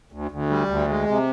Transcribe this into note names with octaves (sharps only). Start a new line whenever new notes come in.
D2
D2
G3
D2
G#3
C3